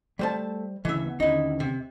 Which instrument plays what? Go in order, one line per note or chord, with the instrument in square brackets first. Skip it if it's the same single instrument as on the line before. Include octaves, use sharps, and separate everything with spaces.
[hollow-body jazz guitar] G3 C5 A5 [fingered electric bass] A3
[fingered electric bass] D2 C#3 [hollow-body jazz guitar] E3 E5
[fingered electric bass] B3
[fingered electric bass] D#2 D3 C#4 [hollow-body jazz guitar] D#4 E4
[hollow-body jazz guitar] C3